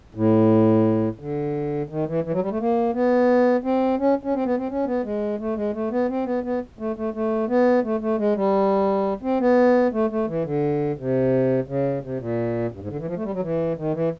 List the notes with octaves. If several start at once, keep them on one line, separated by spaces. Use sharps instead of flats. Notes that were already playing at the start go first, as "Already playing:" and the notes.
A2
D3
D#3
E3
E3
F#3
G3
A3
A#3
B3
C4
C#4
C#4
C4
B3
C4
C#4
B3
G#3
A3
G#3
A3
B3
C4
B3
B3
A3
A3
A3
B3
A3
A3
G#3
G3
C4
B3
A3
A3
E3
D3
C3
C#3
C3
A#2
G2
G#2
D3
E3
F3
A3
G3
F#3
E3
D#3
E3